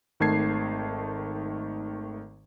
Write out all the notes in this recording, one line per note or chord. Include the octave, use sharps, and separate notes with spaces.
G#1 D#3 A3 A5 G#6 C7